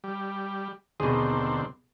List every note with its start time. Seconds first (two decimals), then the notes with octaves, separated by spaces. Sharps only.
0.04 G3
1.00 D#2 B2 D3 C4 G#4